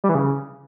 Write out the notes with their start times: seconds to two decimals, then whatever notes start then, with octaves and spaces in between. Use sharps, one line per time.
0.04 G3
0.09 E3
0.15 C#3